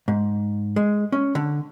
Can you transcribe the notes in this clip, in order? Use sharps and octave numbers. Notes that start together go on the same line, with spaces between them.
G#2
G#3
C#4
D3